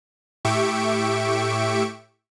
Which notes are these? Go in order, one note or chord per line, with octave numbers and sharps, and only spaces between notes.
A2 G4 E5 C#6 D7